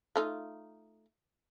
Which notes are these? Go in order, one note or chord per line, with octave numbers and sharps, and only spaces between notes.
A3 D#4 F4